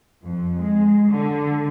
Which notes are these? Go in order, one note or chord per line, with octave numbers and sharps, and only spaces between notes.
F2
G#3
D3